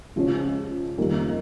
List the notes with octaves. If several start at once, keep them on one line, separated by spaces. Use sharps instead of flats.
C#3 F3 G#3 C#4
F2 D#3 G3 A#3